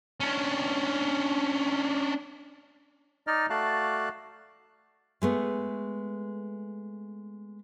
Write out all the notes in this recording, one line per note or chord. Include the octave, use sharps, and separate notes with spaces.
C#4 D4
D#4 D5 D#5 F6
A3 F#4 D5 F5 A5 F#6
G#3 A3 B3